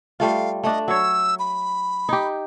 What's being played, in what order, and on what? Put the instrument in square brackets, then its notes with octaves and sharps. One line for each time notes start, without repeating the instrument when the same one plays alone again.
[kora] G3 A3 F4 [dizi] F5
[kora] A3 D4 [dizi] D#5
[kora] F#3 C#5 [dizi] E6
[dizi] B5
[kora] D#4 G4